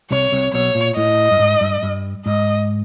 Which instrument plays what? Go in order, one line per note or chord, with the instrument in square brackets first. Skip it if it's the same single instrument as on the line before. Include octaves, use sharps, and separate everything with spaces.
[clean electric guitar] C2 C3 [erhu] C#5
[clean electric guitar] C2 C3
[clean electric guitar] B1 B2 [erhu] C#5
[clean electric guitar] A#2
[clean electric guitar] A2 [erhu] D#5
[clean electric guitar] G2
G#2
G2
G2
[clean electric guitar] G#2 [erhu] D#5